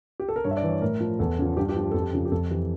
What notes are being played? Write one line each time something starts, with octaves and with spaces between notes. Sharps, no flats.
G4
A4
A#4
G2 C#5
E5
D5
E3
C#5
A2 A#4
F3
E2 A4
C#3 F3
G2 G4
G4
F3
G4
F2 A4
G4
C#3 F3
G4
F2 A4
E3 G4